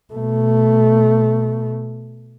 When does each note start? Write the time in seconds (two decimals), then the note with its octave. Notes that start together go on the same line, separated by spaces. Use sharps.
0.13 B2 A3